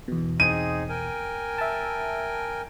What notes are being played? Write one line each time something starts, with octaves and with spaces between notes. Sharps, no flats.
E2 B2
C4 D#4 G#4 D#7
A#4 G5 G#5
E5 A5